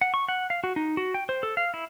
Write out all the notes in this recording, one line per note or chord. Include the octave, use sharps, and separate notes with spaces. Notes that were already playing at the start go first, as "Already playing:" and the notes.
F#5
C#6
F#5
F5
F#4
D#4
F#4
G5
C5
A4
F5
E4